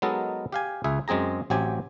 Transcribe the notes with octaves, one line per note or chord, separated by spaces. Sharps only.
F#3 G#3 B3 D#4 A4 A#4
G4 F5 G#5
C#2 G#4 E5
F#2 G#3 C4 G#4 A#5
A1 F#3 C4 G4 G#5